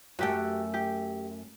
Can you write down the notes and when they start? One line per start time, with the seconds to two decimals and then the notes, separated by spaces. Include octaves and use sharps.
0.19 F#2 A3 F#4 G4 G5
0.74 G4